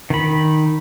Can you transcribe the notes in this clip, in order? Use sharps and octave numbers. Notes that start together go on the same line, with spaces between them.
D#3 B5